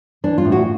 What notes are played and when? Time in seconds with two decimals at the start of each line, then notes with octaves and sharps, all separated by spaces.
0.24 E3 D4
0.38 F4
0.45 A2
0.52 F#4